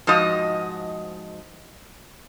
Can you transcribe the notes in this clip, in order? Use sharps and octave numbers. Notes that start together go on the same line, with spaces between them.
G#2 F3 F#4 D#5